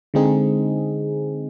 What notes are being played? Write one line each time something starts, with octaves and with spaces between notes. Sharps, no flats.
D3 G#3 C4 D#4 G#4